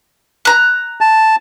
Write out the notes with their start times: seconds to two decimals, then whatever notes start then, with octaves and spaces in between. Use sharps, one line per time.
0.45 A#5 F#6
1.01 A5